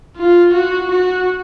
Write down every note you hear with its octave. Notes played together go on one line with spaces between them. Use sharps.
F4
F#4
F#4